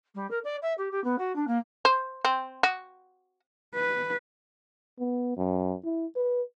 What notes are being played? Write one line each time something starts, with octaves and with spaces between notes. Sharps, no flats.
G3
A#4
D5
E5
G4
G4
B3
F#4
D4
A#3
C5
C4
F#4
B4
B3
F#2
E4
B4